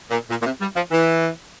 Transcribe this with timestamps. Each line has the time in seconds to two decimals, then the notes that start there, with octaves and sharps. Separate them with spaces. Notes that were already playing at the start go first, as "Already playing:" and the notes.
0.11 A#2
0.30 A#2
0.41 A#2
0.46 C3
0.61 G3
0.76 F3
0.91 E3